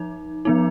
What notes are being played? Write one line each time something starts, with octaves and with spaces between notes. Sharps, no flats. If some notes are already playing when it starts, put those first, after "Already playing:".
Already playing: F3 D#4
F3 B3 D#4